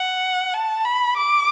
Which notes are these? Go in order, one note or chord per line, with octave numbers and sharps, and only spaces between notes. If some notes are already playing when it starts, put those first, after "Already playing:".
Already playing: F#5
A5
B5
D6